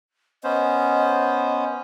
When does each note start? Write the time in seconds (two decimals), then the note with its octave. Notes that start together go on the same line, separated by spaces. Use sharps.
0.44 B3 C#4 C5 D#5